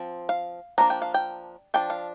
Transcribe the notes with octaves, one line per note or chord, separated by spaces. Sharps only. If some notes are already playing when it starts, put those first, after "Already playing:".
Already playing: F3 C4
F5
F3 A#3 D4 A#5
G5
F5
G5
F3 D4 G5
F5